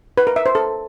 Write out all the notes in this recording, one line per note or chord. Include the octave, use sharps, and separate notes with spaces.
B4
A#4
E5
C5
A4